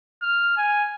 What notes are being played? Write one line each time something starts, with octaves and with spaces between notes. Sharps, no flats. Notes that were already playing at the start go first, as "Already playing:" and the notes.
F6
G#5